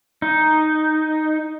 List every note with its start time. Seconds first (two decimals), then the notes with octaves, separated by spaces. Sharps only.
0.22 D#4